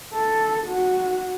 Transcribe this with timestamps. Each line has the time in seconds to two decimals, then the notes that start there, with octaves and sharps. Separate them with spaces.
0.13 A4
0.68 F#4